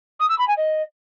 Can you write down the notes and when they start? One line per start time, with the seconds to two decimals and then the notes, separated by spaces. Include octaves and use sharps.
0.19 D#6
0.29 E6
0.38 B5
0.47 G#5
0.57 D#5